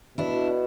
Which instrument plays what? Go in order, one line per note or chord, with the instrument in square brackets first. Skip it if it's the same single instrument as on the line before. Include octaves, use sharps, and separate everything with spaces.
[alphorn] B2 [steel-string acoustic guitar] D4 E4